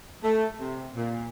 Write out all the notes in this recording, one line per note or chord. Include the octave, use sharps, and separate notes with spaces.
A3
C3
A#2